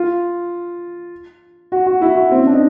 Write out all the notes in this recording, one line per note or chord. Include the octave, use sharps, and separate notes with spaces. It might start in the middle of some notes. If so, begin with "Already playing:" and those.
Already playing: F4
F#4
F#4
E4
F#4
C4
C#4
D4
D#4